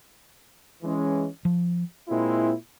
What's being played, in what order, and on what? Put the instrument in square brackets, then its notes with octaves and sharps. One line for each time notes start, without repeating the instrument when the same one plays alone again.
[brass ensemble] E3 G#3 C#4
[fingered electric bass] F3
[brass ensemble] A#2 G#3 C4 E4